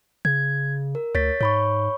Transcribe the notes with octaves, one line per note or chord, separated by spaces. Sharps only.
C#3 G#6
A#4
D2 C#5 A6 B6
G#2 C#5 B5 C#6